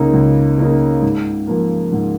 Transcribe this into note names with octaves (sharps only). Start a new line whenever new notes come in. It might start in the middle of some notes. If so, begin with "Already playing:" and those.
Already playing: C#2 C#3 A#3 D#4
C#2
C#3 A#3 D#4
G#2
F3 A#3
G#2